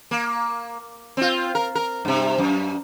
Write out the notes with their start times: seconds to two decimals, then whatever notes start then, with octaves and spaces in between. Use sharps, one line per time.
0.11 A#3
1.17 C4 F4
1.55 A#4
1.75 A#4
2.05 G2 C3
2.38 F#2